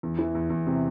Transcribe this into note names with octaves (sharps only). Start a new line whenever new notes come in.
E2
E3
E2
E2
C3